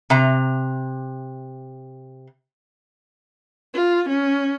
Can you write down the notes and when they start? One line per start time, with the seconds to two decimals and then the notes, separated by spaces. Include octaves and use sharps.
0.10 C3 A#5
3.74 F4
4.08 C#4